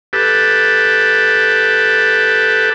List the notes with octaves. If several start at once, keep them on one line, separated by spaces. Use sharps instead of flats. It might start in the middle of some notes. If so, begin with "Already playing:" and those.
G4 A4 B4